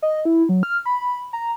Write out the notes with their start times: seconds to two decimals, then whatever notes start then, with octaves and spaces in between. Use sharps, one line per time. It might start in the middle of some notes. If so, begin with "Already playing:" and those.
0.02 D#5
0.25 E4
0.49 F#3
0.63 F6
0.86 B5
1.33 A#5